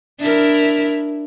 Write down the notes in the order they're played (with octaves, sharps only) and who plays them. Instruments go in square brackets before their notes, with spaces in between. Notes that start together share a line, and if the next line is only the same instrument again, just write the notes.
[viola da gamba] D4 E4 A#4